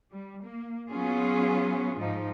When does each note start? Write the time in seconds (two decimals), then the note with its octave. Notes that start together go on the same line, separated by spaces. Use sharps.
0.11 G3
0.42 A#3
0.90 F#3 B3 C#4 F4 G#4
1.97 G#2 F3 D#4